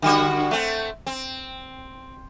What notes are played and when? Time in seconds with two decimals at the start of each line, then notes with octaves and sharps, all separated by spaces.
0.02 D3 G3 F#4
0.51 A3 C4
1.07 C4